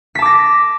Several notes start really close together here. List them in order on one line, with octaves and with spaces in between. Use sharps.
B6 A5 D6 A#6